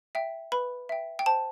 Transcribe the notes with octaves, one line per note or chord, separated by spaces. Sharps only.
E5 G5
B4 B5
E5 G5
G5
C5 A5